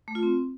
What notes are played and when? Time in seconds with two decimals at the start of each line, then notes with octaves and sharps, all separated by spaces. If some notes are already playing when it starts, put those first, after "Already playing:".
0.08 A3
0.15 F4
0.23 C4